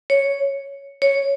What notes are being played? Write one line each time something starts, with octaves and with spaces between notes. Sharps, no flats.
C#5
C#5